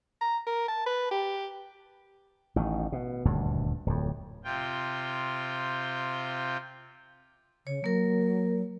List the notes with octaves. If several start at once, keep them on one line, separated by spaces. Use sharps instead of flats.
A#5
A#4
A5
B4
G4
A1 D#3
B2
D#1 D2 G2
D1 F2
C3 F4 G5
C#3 C#5
F#3 A#3 A#4